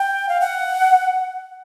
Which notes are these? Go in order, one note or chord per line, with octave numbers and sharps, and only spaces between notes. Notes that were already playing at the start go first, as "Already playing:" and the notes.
Already playing: G5
F5
F#5